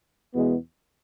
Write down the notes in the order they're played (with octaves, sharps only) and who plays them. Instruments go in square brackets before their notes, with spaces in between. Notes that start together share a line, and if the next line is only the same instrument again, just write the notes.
[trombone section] E2 B2 G#3 B3